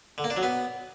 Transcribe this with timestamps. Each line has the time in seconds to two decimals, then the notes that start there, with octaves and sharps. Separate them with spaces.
0.18 D3
0.24 A#3
0.30 D4
0.37 F#3
0.43 B3